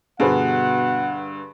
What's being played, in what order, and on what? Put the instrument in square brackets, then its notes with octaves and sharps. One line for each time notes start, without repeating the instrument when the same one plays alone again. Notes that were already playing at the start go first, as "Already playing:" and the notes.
[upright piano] G2 D3 [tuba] B2 [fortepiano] G#4 B4 [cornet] F#5